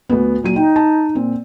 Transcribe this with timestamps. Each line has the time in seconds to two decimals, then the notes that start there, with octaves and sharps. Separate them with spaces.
0.09 D2 B3
0.43 A#2 F#3 D#7
0.56 D#4 G5
0.76 A5
1.15 A#2 C4